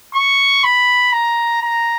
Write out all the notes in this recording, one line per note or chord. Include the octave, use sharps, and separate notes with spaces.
C#6
B5
A#5
A#5